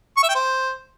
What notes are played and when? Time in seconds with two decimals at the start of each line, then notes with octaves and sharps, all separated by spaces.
0.17 C#6
0.23 E5
0.29 G5
0.35 C5